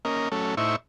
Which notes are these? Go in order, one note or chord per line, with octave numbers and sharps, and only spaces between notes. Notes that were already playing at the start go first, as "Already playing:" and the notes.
A#3 C#4 A#4 D#5
F#3 A3 C#4 A4
A2 D#4 E4 C5 E5 C#6